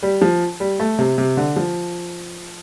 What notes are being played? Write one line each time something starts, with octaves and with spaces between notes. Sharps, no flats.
G3
F3
G3
A3
C3
C3
D3
F3